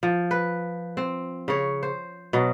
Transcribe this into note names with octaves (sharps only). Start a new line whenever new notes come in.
F3
B4
C4
C#3 C#5
C5
B2 F#3